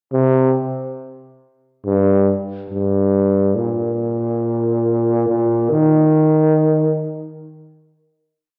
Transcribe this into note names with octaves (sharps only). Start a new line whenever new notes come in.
C3
G2
G2
A#2
A#2
D#3